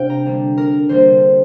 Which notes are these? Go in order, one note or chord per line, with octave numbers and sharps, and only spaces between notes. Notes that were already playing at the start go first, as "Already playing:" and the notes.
Already playing: C3 G3 D4 F5 G5
A#5
D3 G3 A#3 D4
A#4
D3 G3 A#3 D4 C5